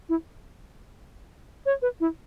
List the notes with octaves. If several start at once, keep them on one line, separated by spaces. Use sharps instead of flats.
E4
C#5
B4
E4